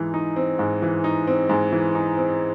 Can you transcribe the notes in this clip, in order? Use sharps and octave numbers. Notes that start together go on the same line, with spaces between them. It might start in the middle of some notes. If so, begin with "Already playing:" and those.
Already playing: G#2 E3
D#4
C4
G#2
E3
D#4
C4
G#2
E3
D#4
C4